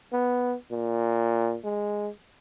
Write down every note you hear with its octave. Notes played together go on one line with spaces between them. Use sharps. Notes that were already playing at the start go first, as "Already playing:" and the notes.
B3
A#2
G#3